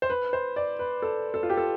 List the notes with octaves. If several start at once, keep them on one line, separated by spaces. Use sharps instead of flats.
C5
B4
C5
D5
B4
A4
A4
F4
G4
A4